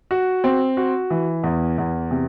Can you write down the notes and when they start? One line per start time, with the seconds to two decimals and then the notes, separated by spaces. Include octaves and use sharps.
0.11 F#4
0.44 C4
0.77 F#4
1.10 E3
1.44 E2
1.78 E2
2.11 C3